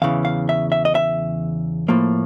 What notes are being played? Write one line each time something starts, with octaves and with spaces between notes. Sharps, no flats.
E2 C#3 E3 F5
F5
E5
E5
D#5
E5
A2 F3 A#3